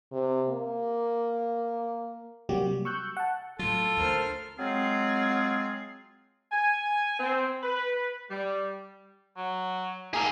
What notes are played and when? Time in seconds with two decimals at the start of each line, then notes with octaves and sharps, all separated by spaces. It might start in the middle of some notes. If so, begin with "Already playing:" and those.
0.12 C3
0.49 A#3
2.49 C3 F#3 G3 A#3 F#4 G4
2.85 C#6 E6 F#6 G6
3.17 F#5 A5
3.59 A2 F#3 F4 A4
3.97 D2 A#4 C5 F6
4.58 F#3 G#3 C4 F4 G#4
6.52 G#5
7.20 C4
7.63 B4
8.31 G3
9.37 F#3
10.14 A#3 G#4 A#4